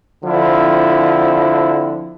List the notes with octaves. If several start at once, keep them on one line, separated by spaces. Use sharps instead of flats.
D3 F3 C4 E4